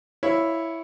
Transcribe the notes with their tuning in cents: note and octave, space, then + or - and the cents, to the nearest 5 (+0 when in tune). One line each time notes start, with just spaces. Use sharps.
E4 +0 C#5 +0 F5 +0